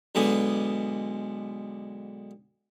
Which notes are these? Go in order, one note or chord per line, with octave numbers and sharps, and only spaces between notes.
B1 D3 G#3 B3 G#4